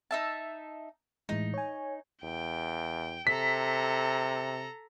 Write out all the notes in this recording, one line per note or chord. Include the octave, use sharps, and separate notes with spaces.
D#4 E5 A5
A2 E3 G#3 D#4
C#5 G#5
E2 G5
C3 A4 A#5 B6